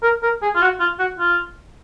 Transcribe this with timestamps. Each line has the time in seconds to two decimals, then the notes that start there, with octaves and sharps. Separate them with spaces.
0.03 A#4
0.23 A#4
0.42 G#4
0.55 F4
0.62 F#4
0.80 F4
0.99 F#4
1.19 F4